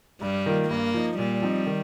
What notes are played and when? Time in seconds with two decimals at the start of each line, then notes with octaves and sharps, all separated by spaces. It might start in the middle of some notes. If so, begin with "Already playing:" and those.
0.21 G2 G3
0.46 D#3 A#3 F4
0.70 G2 A#3
0.94 F3 D#4
1.18 A#2 G3
1.42 F3 C4 D#4
1.67 D#3